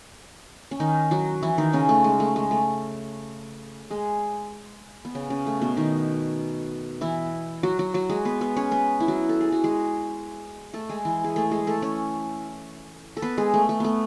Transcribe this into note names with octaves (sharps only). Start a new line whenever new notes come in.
C#4
D#3 D#4
F#3 F#4
E3 E4
D#3 D#4
C#3 C#4
A3
G#3
A3
G#3
A3
G#3 G#4
B3
C#3 C#4
C#3 C#4
A3
B2 B3
D#3 D#4
E3 E4
F#3 F#4
F#3 F#4
F#3 F#4
G#3 G#4
B3 B4
B3 B4
C#4 C#5
B3 B4
E4
F#3 F#4
A4
G#4
F#4
G#3 G#4
A3 A4
G#3 G#4
E3 E4
G#4
A3 A4
G#3 G#4
A3 A4
C#4 C#5
A4
B3 B4
G#3 G#4
A3
A3
A3 B3